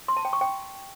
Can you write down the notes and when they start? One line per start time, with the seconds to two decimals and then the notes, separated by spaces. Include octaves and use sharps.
0.08 C6
0.17 A5
0.25 G5
0.33 C#6
0.41 G5